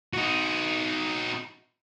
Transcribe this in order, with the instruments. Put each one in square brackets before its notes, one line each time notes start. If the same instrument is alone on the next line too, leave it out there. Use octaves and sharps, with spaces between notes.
[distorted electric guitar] D#4 F#4